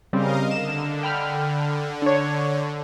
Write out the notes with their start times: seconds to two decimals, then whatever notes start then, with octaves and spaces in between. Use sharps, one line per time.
0.13 C#3 G3 C4 A#4 D#5 F5
0.51 D3 E7
1.03 G5 B5 F6
2.02 D4 C#5